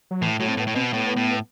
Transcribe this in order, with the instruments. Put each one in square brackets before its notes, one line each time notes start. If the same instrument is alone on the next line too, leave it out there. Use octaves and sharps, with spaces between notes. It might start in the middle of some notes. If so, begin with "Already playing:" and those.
[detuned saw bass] F#3
[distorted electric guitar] A2 [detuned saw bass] E3
[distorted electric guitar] A2 [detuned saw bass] F#3
[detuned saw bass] C4
[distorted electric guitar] A2 [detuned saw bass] B3
[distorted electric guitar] A2
[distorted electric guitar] B2 [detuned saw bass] C4
[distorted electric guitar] A2 [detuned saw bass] B3
[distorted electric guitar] A2